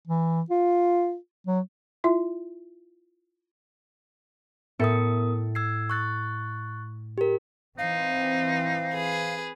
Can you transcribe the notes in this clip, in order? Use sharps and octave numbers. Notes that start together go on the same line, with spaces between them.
E3
F4
F#3
E4 F4 E5
A2 B3 A4 A#4 D#6 C#7
E6 G#6 C7
C#6 F#6 A6
G4 A#4
E3 C4 D#4 F5
G#4 B4